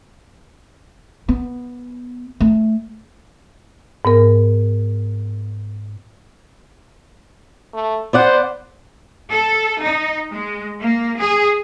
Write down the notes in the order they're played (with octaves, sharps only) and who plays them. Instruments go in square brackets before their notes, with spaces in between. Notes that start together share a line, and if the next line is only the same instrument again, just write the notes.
[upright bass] B3
A3
[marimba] G#2 B3 A#4
[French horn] A3
[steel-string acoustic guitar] B3 D5 F#5 [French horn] C5
[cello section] A4
D#4
G#3
A#3
G#4